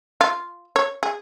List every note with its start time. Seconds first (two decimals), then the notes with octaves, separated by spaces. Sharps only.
0.21 F4
0.76 C#5
1.03 G#4